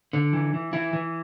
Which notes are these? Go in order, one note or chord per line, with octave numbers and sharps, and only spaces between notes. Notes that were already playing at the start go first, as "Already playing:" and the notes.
D3
E3
E3
E3 E4
E3